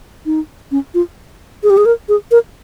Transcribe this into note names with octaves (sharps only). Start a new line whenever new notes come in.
D#4
C#4
F4
G#4
G4
G#4
A#4
G#4
A#4